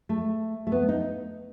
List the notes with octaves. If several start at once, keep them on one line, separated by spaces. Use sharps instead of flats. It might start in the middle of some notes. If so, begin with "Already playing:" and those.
A3
A3
B3
D#4